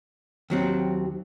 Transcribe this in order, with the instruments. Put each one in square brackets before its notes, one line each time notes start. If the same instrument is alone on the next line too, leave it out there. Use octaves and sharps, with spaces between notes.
[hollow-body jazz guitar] D#2 F#3 C4